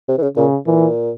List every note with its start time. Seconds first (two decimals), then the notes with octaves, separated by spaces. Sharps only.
0.08 C3
0.18 E3
0.22 C#3
0.37 A#2 C#3
0.67 A#2 E3